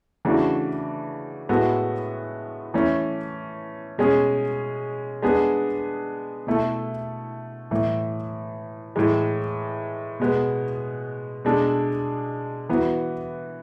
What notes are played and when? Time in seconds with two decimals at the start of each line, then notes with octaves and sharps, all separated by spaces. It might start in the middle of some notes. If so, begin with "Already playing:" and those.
0.25 C#3 E3 A3 D4 F#4
1.49 A2 G#3 B3 F#4 A4
2.74 E3 A3 C#4
3.98 B2 G#3 C#4 G#4
5.22 G#3 B3 D4 G#4
6.47 B2 A3 E4 A4
7.71 A2 E3 A3
8.96 A2 E3 G#3
10.20 B2 G#3 B3
11.45 B2 G#3 D4 A4
12.69 E3 B3 F#4